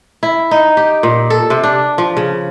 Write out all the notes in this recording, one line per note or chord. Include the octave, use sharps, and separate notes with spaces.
E4
D#4
G4
A#2
A4
C3
D4
F3
C#3